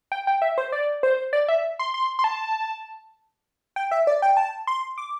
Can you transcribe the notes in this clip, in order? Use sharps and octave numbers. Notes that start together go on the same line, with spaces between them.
G5
G5
E5
C5
D5
C5
D5
E5
C6
C6
C6
A5
G5
E5
D5
G5
A5
C6
D6